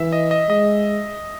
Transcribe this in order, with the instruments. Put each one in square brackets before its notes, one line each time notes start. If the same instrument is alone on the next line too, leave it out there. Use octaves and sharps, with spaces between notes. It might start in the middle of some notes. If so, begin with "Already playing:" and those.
Already playing: [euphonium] E3 [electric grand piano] E5
[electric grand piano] D#5
D#5
[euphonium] G#3 [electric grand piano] D#5